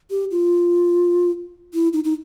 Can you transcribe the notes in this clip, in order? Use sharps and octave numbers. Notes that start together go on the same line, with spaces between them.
G4
F4
E4
D#4
D#4